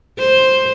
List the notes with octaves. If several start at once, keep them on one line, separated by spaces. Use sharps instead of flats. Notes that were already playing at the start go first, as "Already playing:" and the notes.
C5